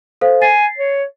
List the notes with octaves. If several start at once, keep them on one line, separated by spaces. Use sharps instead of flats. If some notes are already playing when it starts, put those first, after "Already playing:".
A4 C5 F5
G#5 A6 C7
C#5